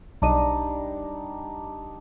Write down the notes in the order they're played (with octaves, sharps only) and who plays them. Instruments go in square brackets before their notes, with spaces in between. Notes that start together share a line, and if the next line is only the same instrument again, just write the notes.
[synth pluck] B1 D#5 D#7 [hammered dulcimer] G3 D4 D#4